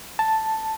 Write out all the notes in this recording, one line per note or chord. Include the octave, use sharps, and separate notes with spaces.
A5